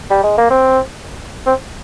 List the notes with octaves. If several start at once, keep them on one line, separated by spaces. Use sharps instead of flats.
G3
G#3
A#3
C4
C4